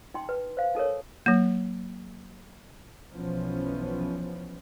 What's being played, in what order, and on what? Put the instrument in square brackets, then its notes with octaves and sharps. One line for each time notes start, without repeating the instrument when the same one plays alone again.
[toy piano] D#4 G5 C6
B4
C5 F5
D#4 A4 A#4 C#5
[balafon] F#3 A#3
[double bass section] B1 E3 F3 B3 C#4